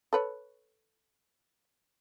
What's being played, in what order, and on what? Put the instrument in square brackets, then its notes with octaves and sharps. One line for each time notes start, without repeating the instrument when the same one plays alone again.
[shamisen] A4 B4 C#5